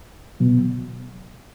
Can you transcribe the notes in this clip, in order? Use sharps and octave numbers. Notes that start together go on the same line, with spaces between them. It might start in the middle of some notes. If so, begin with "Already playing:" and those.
B2 F#3 B3